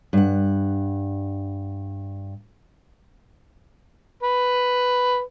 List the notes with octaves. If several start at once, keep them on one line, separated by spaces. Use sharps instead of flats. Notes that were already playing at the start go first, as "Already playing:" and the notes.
G2 F#5
B4